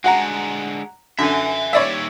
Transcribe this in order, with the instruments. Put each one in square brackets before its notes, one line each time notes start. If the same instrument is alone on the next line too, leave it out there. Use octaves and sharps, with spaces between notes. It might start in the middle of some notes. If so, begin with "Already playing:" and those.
[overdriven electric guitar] D3 G#3 [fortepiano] F#4 F#5 A#5
[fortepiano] F#2 D3 [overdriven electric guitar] E5 G#5
[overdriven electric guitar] D#2 G3 [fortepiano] C#5 D5 E5